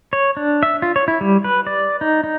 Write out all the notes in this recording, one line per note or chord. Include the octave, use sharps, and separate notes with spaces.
C#5
D4
E5
F4
C#5
E4
G3
B4
D5
D#4
D#4